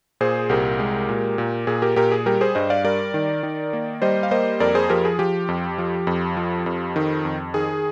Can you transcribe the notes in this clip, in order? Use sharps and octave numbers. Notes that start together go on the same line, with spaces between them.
A#2 G#4 C5
C2 G4 A#4
G#3
A#2
A#2
A#2 G#4
G4 A#4
A#2 G4 A#4
G#4
G3 G4 A#4
G#4 C5
G2 C5 D#5
D5 F5
G3 A#4 D5
D#3
D#3
A#3
G3 C5 D#5
F5
A#3 C5 D#5
F2 A#4 D5
G#4 C5
F3 G4 A#4
G#4
F3 G4
F2
F3
F2
F3
F2
D#3
F2
D#3 G#4